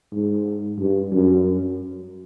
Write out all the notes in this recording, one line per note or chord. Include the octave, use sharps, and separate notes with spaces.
G#2
G2
F#2